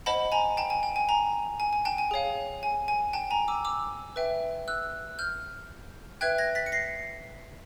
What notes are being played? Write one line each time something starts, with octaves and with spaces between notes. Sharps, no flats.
C5 D#5 F#5 A5 B5
G#5 A#5
G5 A5
G#5
G5
G#5
G#5 A#5
G#5
G#5
G5 A5
G#5
G#4 C#5 F5
G#5
G#5
G5 A5
G#5 A#5
D6 E6
D6 E6
B4 E5 G5
E6 F#6
F6 G6
B4 E5 G5 F#6 G#6
G#6 A#6
A6 B6
C#7
A#6 C7